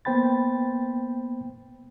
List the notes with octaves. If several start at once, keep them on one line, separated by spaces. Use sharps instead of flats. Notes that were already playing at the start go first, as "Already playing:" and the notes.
A#3 B3 C5 G5 B5 A6